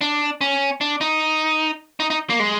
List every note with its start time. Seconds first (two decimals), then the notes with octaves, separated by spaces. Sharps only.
0.01 D4
0.41 C#4
0.81 D4
1.01 D#4
2.00 D#4
2.10 D#4
2.30 A#3
2.39 G#3